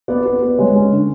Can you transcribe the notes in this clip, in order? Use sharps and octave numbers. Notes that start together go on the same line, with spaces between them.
B3 D5
B3
B3
G#3 C#5
C#4
D3